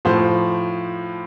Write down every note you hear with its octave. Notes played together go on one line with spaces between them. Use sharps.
A2 F3 C5